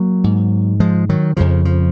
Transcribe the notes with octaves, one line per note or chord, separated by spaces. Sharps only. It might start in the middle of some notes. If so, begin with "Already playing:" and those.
Already playing: F#3 A#3
G#2
F3 G#3
D#3 F#3
F2 C#3 F3
F3